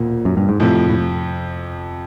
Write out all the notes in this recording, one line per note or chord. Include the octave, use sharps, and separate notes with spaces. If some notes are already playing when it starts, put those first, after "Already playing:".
Already playing: E1 D2 A#2
F#2
G2
G#2
F2 A2 C3 F3
A2